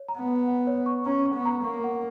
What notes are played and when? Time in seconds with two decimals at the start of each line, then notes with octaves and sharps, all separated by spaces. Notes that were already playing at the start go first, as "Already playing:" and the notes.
Already playing: C#5
0.08 A#5
0.19 B3
0.28 F#5
0.48 F#5
0.67 C#5
0.86 C#6
1.06 C#4 A#5
1.26 C#6
1.35 B3
1.45 A#5
1.64 A#3 C#6
1.84 F#5